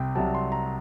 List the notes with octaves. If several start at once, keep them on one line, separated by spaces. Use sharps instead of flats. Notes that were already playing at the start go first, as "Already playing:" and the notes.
Already playing: C2 C3 G5
C2 C3 F#3 A5
C6
A#5